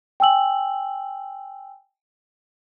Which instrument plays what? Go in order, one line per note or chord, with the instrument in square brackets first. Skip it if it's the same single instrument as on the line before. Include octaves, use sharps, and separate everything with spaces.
[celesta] G5 G#5 E6 F#7